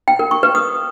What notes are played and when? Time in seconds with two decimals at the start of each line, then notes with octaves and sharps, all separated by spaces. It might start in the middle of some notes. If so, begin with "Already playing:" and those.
0.08 G5
0.19 A#4
0.31 C#6
0.43 B4
0.55 D#6